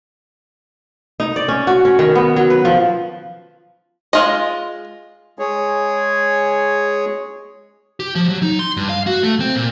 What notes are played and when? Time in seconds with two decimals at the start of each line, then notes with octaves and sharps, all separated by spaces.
1.20 D#4
1.36 D5
1.48 C#4
1.67 F#4
1.85 C#4
1.99 D#3
2.15 B3
2.36 F#3
2.50 B4
2.65 F3
4.13 G#3 F4 D#5
5.39 G#3 G#4 C#5
8.00 G4
8.15 F3
8.29 F#3
8.43 D#4
8.59 C6
8.77 G2
8.89 F5
9.07 F#4
9.23 A3
9.40 C4
9.55 A#2